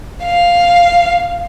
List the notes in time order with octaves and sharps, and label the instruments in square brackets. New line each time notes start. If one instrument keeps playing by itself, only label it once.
[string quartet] F5